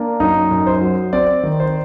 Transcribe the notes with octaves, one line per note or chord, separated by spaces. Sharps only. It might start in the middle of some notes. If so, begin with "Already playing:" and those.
Already playing: A#3 D4
F#2 D#4
F#2
C5
F#3
C4 D5
D#3
C5